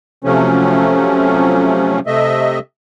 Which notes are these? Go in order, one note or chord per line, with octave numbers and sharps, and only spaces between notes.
C3 F3 F#3 A3 C#4
C3 A3 D#5 E5